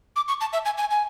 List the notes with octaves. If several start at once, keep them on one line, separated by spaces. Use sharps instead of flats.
D6
C#6
A5
E5
G#5
G#5
G#5